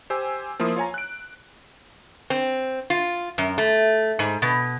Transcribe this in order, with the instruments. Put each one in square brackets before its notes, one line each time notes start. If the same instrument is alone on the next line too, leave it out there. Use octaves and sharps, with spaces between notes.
[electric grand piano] G4 C5 G#5 E6
F3 A#3 E4 C6 D#6
F4 C#5 G#5 A#5
F#6 D7
[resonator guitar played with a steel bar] C4
F4
F#2
A3
G#2
B2